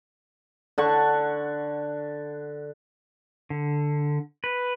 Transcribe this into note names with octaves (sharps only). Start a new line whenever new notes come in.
D3 F#5 C#6
D3
B4